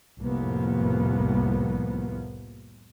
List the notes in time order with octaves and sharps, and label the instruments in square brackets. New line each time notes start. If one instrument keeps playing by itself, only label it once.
[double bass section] C2 F2 A2 F3 A#3 B3